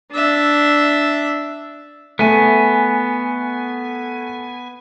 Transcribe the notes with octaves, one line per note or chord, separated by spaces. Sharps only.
D4 E5
A3 B3 G#5